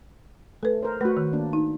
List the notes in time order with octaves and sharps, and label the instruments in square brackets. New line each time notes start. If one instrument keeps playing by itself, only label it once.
[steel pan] A3 [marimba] A4 B4
[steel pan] A#4 C5
[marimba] A3 [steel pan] F#4 B4
[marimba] D#3
[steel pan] A#3 D4
[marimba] D#4